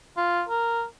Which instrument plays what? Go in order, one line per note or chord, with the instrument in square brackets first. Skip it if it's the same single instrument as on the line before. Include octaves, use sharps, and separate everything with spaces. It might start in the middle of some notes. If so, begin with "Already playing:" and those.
[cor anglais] F4
A#4